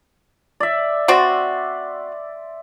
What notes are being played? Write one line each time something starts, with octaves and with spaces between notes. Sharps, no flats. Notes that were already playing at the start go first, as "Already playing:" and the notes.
D5 E5
C4 F#4 D5 C6